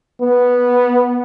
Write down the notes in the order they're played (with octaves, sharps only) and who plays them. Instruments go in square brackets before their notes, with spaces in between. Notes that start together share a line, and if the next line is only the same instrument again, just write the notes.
[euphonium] B3